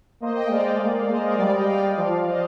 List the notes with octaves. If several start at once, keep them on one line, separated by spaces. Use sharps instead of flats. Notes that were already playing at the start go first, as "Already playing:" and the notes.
A#3 C5 D#5
D#5 G5
G#3 D5 F5
A#3
G#3 C5 D#5
A#4 D5
G3 D5 F5
D#5 G5
D5 F5
F3
C5 D#5